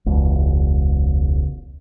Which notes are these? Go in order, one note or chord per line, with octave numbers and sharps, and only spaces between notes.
E1 C#2